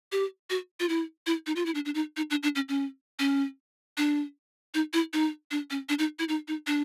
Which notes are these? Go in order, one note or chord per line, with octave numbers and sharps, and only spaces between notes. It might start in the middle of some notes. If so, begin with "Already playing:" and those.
G4
F#4
F4
E4
E4
D#4
F4
E4
D4
D4
D#4
D#4
D4
D4
C#4
C#4
C#4
D4
D#4
E4
D#4
D4
C#4
D4
D#4
E4
D#4
D#4
D4